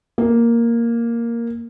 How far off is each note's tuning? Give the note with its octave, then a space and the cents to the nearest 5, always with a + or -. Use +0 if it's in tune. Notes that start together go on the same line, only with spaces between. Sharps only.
A#3 +0